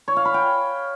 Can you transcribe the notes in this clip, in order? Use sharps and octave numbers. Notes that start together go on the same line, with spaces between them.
C#5
F5
B5
G5